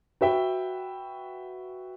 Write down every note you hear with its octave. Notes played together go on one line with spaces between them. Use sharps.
F#4 B4 E5 G5